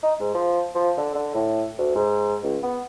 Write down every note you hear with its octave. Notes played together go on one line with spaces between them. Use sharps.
D#4
G#2
F3
F3
D3
D3
A2
D2
G#2
C#2
B3